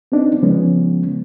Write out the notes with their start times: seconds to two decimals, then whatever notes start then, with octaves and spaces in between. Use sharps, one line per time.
0.12 B3 C4 D4 D#4
0.42 C#3 F3 G#3 B3 C#4